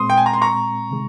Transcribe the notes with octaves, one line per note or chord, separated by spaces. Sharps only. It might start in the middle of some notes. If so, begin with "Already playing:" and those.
Already playing: A#2 G#3 C4 C6 D#6
G5
G#5
A#5
C6
A#5 C#6
C3 D#3 G#3